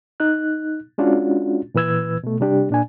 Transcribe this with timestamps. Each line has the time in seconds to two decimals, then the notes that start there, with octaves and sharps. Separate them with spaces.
0.20 D#4 F#6
0.98 G#3 C#4 D4 F4 F#4
1.75 A#2 E3 B4 E6 G#6
2.23 B2 A3
2.40 C3 G3 D4 G4
2.69 A#2 D4 G#5